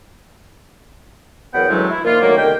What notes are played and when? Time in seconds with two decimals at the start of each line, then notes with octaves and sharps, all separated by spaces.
1.54 E2 F#3 B3 A#4 F#5 G5
1.69 D2 C#3 E3 F#3 G#3 A3
1.90 E4
2.04 A#2 D#3 F3 A#3 F4
2.22 D3 D#3 F#3 A3 A#3
2.36 C2 D3 D#3 A#4 G5